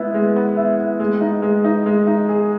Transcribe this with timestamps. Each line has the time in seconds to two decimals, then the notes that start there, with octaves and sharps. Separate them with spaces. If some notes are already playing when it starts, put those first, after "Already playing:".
Already playing: G#3 B3 E4
0.14 G#3
0.36 B3
0.57 E4
0.79 B3
1.00 G#3
1.21 D#4
1.42 G#3
1.64 D#4
1.86 G#3
2.07 D#4
2.29 G#4